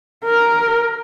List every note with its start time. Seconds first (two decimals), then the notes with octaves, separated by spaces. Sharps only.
0.25 A#4